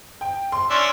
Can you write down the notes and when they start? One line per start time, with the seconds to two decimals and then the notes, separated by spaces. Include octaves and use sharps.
0.21 G5
0.52 C6
0.70 C#4 D4 E5